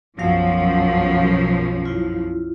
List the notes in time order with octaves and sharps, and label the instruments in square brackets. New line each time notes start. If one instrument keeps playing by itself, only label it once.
[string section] B1 F#2 F3 [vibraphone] F#3 F5 F#5
[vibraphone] E4 F4